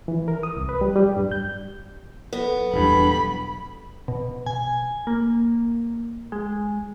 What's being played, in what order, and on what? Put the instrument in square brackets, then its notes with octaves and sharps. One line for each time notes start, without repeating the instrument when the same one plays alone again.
[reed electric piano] E3
A#4
D#6
C2
B4
G3
G3
G2
G6
[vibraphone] F#3 A4 B4 [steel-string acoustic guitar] B3
[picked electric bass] E1 G2 [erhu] B5
[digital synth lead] B2
G#5
A#3
G#3